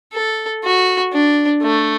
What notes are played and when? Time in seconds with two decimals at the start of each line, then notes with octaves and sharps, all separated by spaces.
0.13 A4
0.64 F#4
1.13 D4
1.63 A3